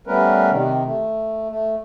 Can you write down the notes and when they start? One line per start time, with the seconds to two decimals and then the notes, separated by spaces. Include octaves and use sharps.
0.07 G3 A3 B3 C#4 A#4 B4
0.50 C3 D#3
0.84 A3
1.49 A3